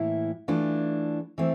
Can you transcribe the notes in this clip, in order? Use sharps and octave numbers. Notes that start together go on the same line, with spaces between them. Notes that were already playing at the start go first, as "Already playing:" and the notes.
Already playing: A2 E3 A#3 E4
E3 A3 D4 F4
E3 A3 C4